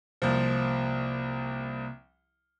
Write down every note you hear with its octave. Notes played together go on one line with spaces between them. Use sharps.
C2 C3 F3 A#3